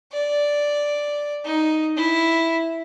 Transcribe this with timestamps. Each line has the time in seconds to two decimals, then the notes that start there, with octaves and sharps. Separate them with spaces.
0.12 D5
1.45 D#4
1.96 E4